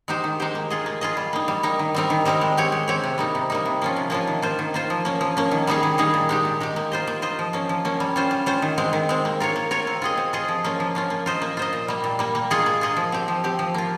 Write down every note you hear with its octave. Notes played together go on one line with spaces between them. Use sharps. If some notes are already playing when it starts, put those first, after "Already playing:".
G#3 D#4 G4 C5
D#3
G#3 D#4 G4 C5
A#3
F4 G#4 D#5
A#3
F4 G#4 D#5
G3
A#3 D#4
G3
A#3 D#4
D#3
G3 C4 D#4 A#4
D#3
G3 C4 D#4 A#4
G#3
C4 G4 C#5
G#3
C4 G4 C#5
C3
G3 A#3 D#4
C3
G3 A#3 D#4
C3
F3 A#3 C#4 F4
C3
F3 A#3 C#4 F4
D#3
A#3 F4 C5
D#3
A#3 F4 C5
F3
A#3 C#4
F3
A#3 C#4
D#3
G3 A#3 D#4 G#4
D#3
G3 A#3 D#4 G#4
A#2
G#3 D#4 G4
A#2
G#3 D#4 G4
A#3
F4 C5 D#5
A#3
F4 C5 D#5
F3
A#3 C#4
F3
A#3 C#4
G3
C#4 F4 C5
G3
C#4 F4 C5
D#3
G#3 C4
D#3
G#3 C4
A#3
F4 A#4 C#5
A#3
F4 A#4 C#5
C4
F4 G#4 D#5
C4
F4 G#4 D#5
F3
A#3 C#4 F4
F3
A#3 C#4 F4
A#3
F4 C5 D#5
A#3
F4 C5 D#5
A#2
G3 A#3
A#2
G3 A#3
A#3
F4 G#4 D#5
A#3
F4 G#4 D#5
F3
C4 G4
F3
C4 G4
F3
A#3 F4